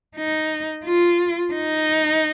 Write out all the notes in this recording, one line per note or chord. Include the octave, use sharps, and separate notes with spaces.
D#4
F4
D#4